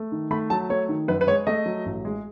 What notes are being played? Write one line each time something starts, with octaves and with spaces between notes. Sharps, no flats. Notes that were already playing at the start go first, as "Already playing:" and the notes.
Already playing: A3
D#3
A3 B5
F#3 A5
A3 C#5
D#3
F#2 B4
B4
G#3 C#5
A3 D#5
F#3
A1
G#3